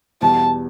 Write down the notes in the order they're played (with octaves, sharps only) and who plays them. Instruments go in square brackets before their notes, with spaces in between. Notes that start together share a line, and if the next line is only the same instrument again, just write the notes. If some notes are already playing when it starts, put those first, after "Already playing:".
[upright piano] E2 B2 G3 [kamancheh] A5